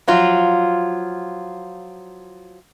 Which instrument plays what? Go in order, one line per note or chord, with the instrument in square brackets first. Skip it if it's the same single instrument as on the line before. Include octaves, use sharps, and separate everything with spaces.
[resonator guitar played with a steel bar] F3 F#3 F4